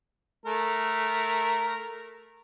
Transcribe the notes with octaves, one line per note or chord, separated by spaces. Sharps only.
A3 A#4